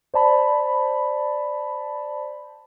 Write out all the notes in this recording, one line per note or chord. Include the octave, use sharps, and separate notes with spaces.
C5 D5 A5 B5